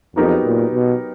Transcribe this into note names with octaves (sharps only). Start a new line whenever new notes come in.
F2 F#3 B3 D#4 G4 A#4
A#2
B2